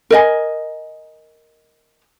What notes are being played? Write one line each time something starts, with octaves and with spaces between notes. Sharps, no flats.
A#4 D#5 G#5